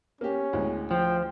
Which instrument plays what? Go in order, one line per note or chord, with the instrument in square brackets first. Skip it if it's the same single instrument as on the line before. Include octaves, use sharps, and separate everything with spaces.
[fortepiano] A#3 G4 [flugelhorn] C#4
[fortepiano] D2 A2 G#3
[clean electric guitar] F3 [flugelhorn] G5